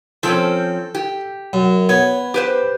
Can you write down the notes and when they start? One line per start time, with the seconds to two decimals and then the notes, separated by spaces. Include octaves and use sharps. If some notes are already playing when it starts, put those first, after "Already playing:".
0.23 F3 C4 C#4 A4
0.95 G4
1.53 F#2
1.89 B3 C#5
2.34 G4 B4 C5